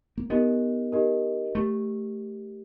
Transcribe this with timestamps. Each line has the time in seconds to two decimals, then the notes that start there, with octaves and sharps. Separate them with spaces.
0.18 A#3
0.30 B3 D#4 G4 A#4 D#5
0.92 D#4 G4 A#4 D#5
1.55 A3 G4